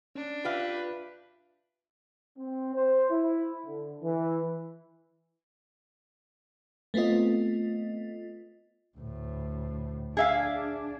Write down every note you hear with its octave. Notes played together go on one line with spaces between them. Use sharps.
C#4 D4
F4 G4 B4 E5 F5
C4
C5
E4
D3
E3
A3 B3 C4 F4 D#5
D2 A2
D4 G#4 E5 F5